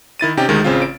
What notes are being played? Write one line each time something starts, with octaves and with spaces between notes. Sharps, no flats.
D#3 E4 A6 D#7
C3 C#4 D#4 G4
D2 D#3 G#3
A1 C#3 C4 F4
D7